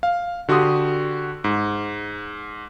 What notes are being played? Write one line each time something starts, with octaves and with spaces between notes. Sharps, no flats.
F5
D3 F#4 G4 C6 D#6
G#2